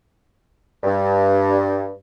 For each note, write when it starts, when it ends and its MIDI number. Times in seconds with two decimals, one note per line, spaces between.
0.84 1.92 43